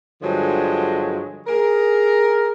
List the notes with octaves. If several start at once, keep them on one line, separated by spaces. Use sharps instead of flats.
G2 D3 F3 F#3 G#3
G#4 A#4